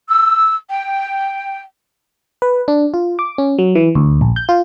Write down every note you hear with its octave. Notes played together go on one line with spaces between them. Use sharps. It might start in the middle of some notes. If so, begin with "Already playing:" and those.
E6
G5
B4
D4
F4
D6
C#4
F#3
E3
D2
A#1
G6
F4